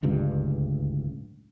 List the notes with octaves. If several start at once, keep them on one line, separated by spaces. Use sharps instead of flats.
D1 C#2 G2